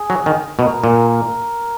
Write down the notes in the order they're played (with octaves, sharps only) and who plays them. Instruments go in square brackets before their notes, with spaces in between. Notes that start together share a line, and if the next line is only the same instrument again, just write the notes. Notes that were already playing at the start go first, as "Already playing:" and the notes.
Already playing: [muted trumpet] G#4
[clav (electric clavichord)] F#3
D#3
[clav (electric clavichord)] B2 [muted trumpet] A#4
[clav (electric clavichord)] A#2
[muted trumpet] A#4